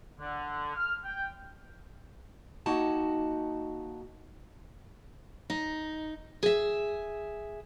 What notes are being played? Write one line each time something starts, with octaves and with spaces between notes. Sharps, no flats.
D3
F6
G5
A#3 D#4 F#4 G5 A5
D#4
G#4 E5